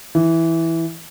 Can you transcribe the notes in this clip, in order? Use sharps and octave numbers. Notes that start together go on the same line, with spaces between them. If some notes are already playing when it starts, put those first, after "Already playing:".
E3